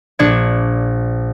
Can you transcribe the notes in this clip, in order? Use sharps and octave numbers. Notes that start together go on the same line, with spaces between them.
A#1 D4 C#6 G#6